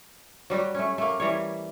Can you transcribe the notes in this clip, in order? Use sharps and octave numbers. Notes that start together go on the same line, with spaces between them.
F#3 G3 F#4 G4
A3 C#4
A3 A#3
E3 G3 C#5